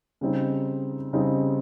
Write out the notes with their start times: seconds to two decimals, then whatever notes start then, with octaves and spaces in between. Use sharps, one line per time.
0.21 C#3 G3 C4 D#4
1.13 C#3 G3 C4 D#4